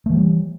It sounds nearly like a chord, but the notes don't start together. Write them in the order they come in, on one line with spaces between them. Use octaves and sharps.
A3 E3 G3